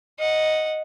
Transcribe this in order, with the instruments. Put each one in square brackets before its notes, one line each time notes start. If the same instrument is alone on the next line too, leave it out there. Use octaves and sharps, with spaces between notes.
[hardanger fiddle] D#5 F#5